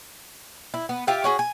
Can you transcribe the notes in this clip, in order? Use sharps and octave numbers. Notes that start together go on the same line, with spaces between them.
E4
B3
F4 G4 E5
C#4 F#4 G#4
G#5